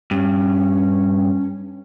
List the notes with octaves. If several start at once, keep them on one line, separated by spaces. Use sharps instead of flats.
G2 C#4